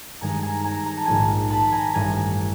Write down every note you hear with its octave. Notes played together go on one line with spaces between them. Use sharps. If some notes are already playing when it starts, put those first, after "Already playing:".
G2 D#3 G#3 G#5 A#5
G#5 A#5
G#5 A#5
A#5
A5
A#1 G#2 D#3 G#5 A#5
A5 B5
G#5 A#5
A1 G2 E3 G#5 A#5